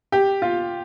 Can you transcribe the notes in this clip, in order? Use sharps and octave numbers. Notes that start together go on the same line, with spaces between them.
G4
F4